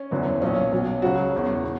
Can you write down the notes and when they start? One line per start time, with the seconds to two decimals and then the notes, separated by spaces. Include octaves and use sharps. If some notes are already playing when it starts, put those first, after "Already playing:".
Already playing: C#4
0.11 F#1 E2 D3 F#3
0.42 B1 A#2 F#3 C#4
0.72 B1 B2 F#3
1.02 C#2 C#3 F#3 F#4
1.33 E1 E2 C#3 F#3
1.63 B2